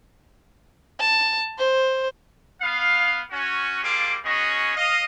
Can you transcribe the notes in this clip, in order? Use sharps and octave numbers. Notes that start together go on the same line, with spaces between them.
A5
C5
B3 F5
C#4 F#4
G3 A#3 F4 G#4 D6
B3 C#4 F#4 G#4 D#5
D#5 F5